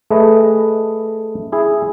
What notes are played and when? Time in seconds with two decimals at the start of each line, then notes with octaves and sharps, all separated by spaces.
0.10 A3 G#4 B4 D#5
1.52 E4 G#4